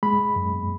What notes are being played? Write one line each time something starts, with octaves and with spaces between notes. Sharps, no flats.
G#3 B5
F#2